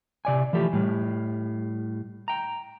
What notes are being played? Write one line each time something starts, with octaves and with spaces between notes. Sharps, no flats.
C3 D5 G#5
E3 F3 A3 G4
A2 G3
G5 A#5